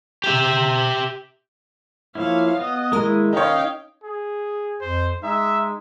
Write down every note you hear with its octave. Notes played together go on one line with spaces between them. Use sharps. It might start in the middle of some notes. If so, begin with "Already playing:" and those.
G4 E5
F3 A#3 E4 C#5 F5
B3 D#5
D#2 G#3 E4 A#4
C#4 D#4 C#5 F5 G5 D#6 G6
G#4
F2 C5
G#3 D#4 E5